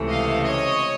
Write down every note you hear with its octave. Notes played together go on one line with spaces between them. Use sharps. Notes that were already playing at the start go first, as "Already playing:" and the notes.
Already playing: C#2 C3 E3 A3
D#5 F5
C#5 D#5